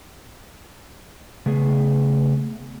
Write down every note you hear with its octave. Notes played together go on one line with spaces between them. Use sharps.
C#3 A3 B3 G#4